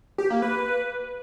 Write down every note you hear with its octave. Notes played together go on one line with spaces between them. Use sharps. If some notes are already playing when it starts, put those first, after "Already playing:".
G4
A#3
B4